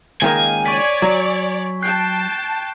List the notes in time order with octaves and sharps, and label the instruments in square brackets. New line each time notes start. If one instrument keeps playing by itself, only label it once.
[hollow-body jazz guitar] C#2 D#3 A#3 [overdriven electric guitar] G#5
[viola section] C#5 D5 [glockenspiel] C#6 B6
[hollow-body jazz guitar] F#3
[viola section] G5 A5 [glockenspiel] F#6 G6 C7